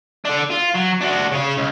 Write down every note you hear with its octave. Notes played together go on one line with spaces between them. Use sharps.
D4 A4
F4
F#3
D4 F#4
C#3 C#5
C#2